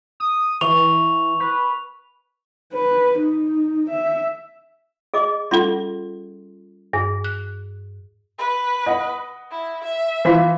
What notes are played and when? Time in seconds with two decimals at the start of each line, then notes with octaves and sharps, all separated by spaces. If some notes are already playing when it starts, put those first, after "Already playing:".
0.20 D#6
0.61 E3 C#6 F7
1.40 B4
2.73 B4
3.18 D#4
3.89 E5
5.14 G#4 D#5 D6
5.51 G3 C#4 F4 A4 C6
6.93 G2 G#4
7.24 F#6
8.38 B4
8.86 D#5 F#5
9.51 E4
9.84 E5
10.25 E3 F4 B6